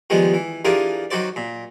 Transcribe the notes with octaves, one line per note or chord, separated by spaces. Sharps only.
D#3 F3 G3 G#3 B3
E3
E3 D4 F4 G4 G#4 A#4
D#3 F#3 F#4 C5 D5
A#2